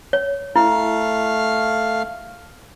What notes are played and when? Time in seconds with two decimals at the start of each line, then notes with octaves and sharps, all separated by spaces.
0.13 C#5
0.56 A3 E4 F5 F6